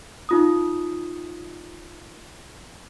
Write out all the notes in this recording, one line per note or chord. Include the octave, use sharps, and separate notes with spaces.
D#4 F4 D#6